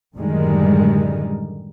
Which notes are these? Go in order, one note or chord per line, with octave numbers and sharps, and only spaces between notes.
F#2 A2 D3 D#3 G3 G#3